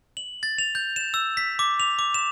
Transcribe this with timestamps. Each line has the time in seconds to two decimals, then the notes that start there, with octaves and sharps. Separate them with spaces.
0.17 F#7
0.43 A6
0.58 F7
0.75 G6
0.96 E7
1.14 E6
1.37 B6
1.59 D6
1.80 F7
1.99 D6
2.14 E7